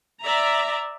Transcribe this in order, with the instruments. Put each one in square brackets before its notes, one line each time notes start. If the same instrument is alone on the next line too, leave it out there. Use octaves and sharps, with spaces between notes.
[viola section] D5 E5 A#5